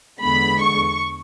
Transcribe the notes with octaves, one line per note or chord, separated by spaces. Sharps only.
E2 D3 G#3 B3 B5
C#6